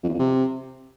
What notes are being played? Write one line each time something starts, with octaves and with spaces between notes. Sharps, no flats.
F2
E2
F2
C3